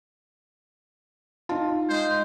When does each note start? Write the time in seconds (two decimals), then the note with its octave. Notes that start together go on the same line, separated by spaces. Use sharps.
1.49 D#4 F4 A5
1.89 G#3 C5